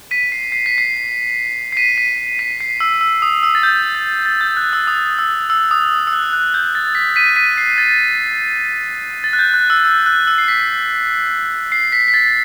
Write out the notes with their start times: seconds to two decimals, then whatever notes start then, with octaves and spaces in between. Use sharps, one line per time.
0.11 B6 D#7
0.32 C7
0.52 C7
0.66 B6
0.78 C7
1.72 C7
1.77 B6 D#7
1.97 B6 D#7
2.39 B6 D#7
2.60 C7
2.80 E6
3.01 E6
3.22 D#6
3.43 E6
3.55 A6
3.63 G6
3.95 A6
4.26 A6
4.41 G6
4.57 F#6
4.73 E6
4.87 D#6
5.19 E6
5.50 E6
5.71 D#6
6.07 E6
6.13 F#6
6.33 F#6
6.54 G6
6.75 A6
6.95 B6
7.16 B6 D#7
7.36 B6 D#7
7.58 C7
7.78 A6
9.24 A6
9.33 F#6
9.39 G6
9.54 F#6
9.70 E6
9.85 E6
10.06 F#6
10.27 E6
10.38 C7
10.48 B6
11.72 C7
11.92 B6
12.08 B6
12.14 A6